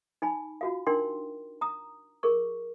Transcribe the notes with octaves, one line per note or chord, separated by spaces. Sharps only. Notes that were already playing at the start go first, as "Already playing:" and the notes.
D#4 G#5 B5
F4 F#4 F5
D4 D#4 A#4 G5 C6
A#5 D#6
G#4 A#4 C#6